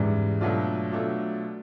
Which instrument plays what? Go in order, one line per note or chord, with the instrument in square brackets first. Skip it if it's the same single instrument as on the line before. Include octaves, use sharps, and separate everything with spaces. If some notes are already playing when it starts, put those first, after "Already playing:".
Already playing: [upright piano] E2 C#3 E3 G3 [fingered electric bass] G#2
[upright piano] B2 F#3 A3 D4 F4
B2 F#3 A3 D4 F4